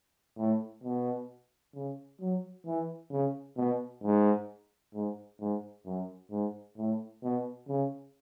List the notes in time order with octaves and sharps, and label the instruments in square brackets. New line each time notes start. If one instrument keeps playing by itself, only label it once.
[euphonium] A2
B2
C#3
F#3
E3
C#3
B2
G#2
G#2
G#2
F#2
G#2
A2
B2
C#3